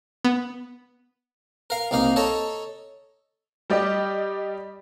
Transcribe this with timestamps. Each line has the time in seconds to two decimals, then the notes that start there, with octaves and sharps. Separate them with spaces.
0.25 B3
1.70 A#4 F5
1.91 C2 A#3 D#4 F5
2.16 A4 C#5 D#5 A5 A#5
3.70 G3 G4 D5 D#5 D6